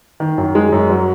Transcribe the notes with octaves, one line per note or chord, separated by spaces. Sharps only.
D#3
F#2
G#3
F#2
F#3